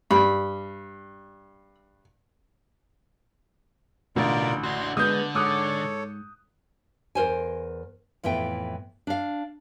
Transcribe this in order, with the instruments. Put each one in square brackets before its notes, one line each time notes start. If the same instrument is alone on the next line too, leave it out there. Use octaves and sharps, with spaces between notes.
[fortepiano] G2 [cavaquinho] B5
[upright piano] A1 [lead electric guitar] B2 [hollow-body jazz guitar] D3 [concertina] F4 A#4 D5
[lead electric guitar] D4 F#4 [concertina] C6
[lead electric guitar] D3 [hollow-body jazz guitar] G#3 B3 [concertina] D#5 [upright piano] D#6 G6
[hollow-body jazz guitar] G#2 [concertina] A4 C#5 [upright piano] D6 D#6 F#6
[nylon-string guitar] E2 A#4 C5 G#5
F2 A2 E3 B3 G5
D4 F5